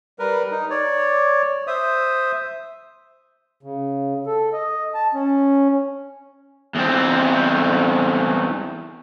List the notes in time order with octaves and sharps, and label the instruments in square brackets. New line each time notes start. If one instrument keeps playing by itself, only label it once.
[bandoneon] G3 A#4 B4
D#4
C#5 D5
C5 E5 D#6
[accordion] C#3
A4
D#5
A5
C#4
[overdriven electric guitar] E2 C4